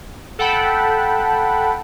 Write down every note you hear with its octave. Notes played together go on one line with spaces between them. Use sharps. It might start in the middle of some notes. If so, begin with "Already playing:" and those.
A4 F#5 G5 A5 B5